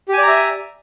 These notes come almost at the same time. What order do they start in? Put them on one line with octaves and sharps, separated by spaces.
G4 G#5 D5 A#5 E5